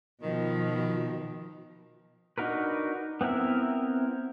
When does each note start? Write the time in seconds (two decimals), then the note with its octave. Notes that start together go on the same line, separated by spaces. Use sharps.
0.23 B2 D#3 F3
2.38 D4 D#4 F#4 A#4 B4
3.21 B3 C4 E4 A#4 E5